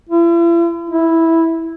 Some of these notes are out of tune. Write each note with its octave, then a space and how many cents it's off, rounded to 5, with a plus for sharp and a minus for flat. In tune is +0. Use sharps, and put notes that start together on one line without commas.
E4 +45
E4 -5